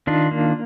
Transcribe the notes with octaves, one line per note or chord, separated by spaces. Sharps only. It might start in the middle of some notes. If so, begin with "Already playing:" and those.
D#3 D4 F4
A#3